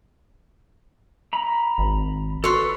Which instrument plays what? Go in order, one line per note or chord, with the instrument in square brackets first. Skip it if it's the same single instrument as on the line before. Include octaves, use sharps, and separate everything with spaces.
[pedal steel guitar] A#5 B5
[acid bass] G#1
[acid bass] F#4 [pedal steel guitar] A4 B4 [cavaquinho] C#5 C6